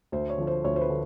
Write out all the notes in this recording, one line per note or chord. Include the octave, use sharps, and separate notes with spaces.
D2 C5
C#5
D3 F3
C5
D2 C#5
C5
B4
D3